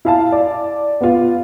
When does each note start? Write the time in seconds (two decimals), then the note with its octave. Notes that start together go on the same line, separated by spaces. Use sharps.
0.05 E4 F5 A5
0.32 D5
1.01 B3 F4